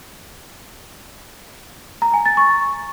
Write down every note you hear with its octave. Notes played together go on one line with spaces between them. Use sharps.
A#5
G#5
A6
C#6